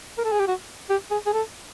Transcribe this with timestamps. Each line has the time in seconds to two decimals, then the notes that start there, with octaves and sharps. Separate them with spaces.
0.18 A#4
0.24 A4
0.32 G#4
0.39 G4
0.47 F#4
0.90 G4
1.11 G#4
1.26 G#4
1.33 A4